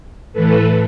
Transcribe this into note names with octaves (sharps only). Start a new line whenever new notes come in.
A2 E3 A4 B4